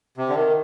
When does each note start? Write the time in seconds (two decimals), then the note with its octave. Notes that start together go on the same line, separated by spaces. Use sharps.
0.17 C3
0.29 D3
0.36 D#3